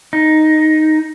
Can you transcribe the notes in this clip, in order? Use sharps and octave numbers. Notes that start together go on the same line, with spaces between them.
D#4